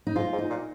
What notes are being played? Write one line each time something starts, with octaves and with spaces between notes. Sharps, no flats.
D#4
G#2 F4
G#2
D#4
A#2